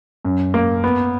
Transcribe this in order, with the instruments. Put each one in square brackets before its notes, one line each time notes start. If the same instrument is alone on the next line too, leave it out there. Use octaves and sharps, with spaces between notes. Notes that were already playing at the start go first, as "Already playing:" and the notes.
[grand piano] F#2
A#3
B3